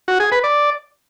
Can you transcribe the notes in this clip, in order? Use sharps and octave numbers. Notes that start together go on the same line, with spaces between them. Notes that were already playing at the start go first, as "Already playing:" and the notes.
F#4
G#4
B4
D5